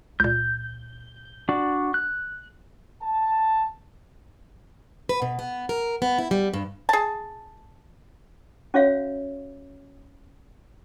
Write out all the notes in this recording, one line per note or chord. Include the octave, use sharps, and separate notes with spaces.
C#2 A#2 G6
D4 F#4 D5
F#6
A5
B4
B2
B3
A#4
B3
E4
G3
G2
G#4 A5
C#4 F#4 C#5 E5 F5